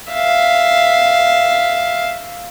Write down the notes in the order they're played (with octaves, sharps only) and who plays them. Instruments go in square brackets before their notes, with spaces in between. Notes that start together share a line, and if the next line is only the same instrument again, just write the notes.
[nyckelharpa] E5 F5